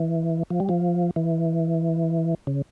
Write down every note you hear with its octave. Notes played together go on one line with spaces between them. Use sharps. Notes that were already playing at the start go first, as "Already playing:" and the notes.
Already playing: E3
F3
G3
F3
E3
C#3